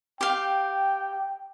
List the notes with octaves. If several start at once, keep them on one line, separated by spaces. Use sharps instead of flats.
G4 F5 G5